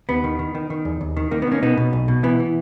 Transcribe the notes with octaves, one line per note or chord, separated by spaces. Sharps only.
D#2 B3
D#3
D#3
D#3
D#3
E2
D#2
D#3
D#3 A#3
B3
D#3 A#3 C#4
B2 B3 D#4
B2
B1
B2
E3 B3
E3